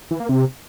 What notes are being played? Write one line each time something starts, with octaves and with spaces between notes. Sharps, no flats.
E3
A#3
C3